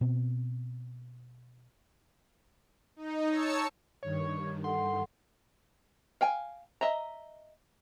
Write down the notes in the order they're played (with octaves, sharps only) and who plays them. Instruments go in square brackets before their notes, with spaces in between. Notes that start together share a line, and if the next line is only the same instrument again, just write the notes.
[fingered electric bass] B2 C4
[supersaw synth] D#4
C#5 A5 E6 C#7
[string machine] G2 D#3 [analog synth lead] C#5
[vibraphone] A4 F#5 [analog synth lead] C6
[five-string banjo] F5 G5 G#5
D#5 E5 A#5